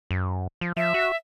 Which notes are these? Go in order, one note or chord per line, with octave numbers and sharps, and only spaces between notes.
F#2
F3
F3 E5
F#4